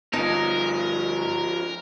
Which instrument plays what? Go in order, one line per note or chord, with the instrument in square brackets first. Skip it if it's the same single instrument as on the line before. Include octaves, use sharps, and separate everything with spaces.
[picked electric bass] G1 B3 [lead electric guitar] F3 C#4 [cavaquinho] D#4 [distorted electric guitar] A#4